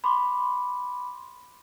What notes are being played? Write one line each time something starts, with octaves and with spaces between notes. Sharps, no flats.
B5 C6 D6